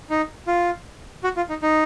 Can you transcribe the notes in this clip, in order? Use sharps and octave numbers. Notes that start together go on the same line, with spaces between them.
D#4
F4
F#4
F4
D#4
D#4